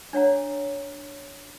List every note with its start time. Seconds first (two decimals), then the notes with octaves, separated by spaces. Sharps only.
0.13 D4 C#5 F#5 A#5